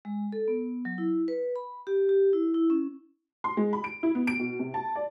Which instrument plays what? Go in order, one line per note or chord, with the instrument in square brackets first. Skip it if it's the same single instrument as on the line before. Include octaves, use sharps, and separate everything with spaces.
[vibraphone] G#3
A4
B3
F#3
E4
B4
B5
G4
G4
E4
E4
C#4
[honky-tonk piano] C6
G#3
B5
D7
E4
B3
D7
B2
C3
A5
D5